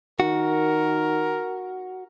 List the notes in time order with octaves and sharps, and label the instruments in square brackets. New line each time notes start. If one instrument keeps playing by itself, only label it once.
[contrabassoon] D#3 [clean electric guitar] F#4 [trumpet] A#4